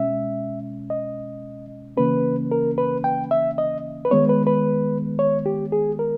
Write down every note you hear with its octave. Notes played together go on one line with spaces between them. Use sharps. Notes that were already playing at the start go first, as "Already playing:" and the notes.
Already playing: B2 G#3 C#4 E5
D#5
C#3 E3 A#3 C#4 B4
A#4
B4
G5
E5
D#5
B4
D#3 G#3 B3 C#5
B4
B4
C#5
G4
G#4
A#4